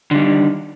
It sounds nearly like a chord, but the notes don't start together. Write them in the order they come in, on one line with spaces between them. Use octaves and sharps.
D3 G3 D#3